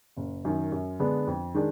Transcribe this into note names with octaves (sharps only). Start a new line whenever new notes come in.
F#1
F#2 D#3
F#2
D3 G#3 B3 D4
F2
D#3 G#3 D4